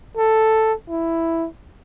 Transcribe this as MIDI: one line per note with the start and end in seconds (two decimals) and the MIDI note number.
0.17 0.73 69
0.90 1.48 64